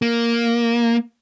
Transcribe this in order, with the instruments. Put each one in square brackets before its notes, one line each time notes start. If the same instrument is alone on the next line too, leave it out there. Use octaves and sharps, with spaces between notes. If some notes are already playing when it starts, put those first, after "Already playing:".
[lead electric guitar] A#3